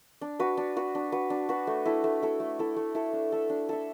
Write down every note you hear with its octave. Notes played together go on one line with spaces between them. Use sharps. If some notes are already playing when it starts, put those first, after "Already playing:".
D4
F#4 B4
D4
F#4 B4
D4
F#4 B4
D4
F#4 B4
A3
E4 A4
A3
E4 A4
A3
E4 A4
A3
E4 A4
D4
A4 E5
D4
A4 E5